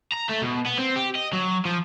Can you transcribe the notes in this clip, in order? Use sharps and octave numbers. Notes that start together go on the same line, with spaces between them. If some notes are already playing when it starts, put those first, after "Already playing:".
A#5
A3
B2
B3
C4
G4
D#5
F#3
F3